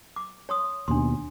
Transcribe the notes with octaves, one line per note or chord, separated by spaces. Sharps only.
D6
C#5 C6 D#6
D#2 B2 D4 C6